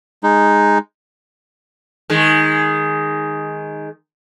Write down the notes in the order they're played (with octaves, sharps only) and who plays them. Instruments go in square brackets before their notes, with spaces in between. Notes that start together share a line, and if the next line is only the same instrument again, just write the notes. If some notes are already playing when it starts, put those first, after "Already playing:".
[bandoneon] G#3 D#4
[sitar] D#3 G#3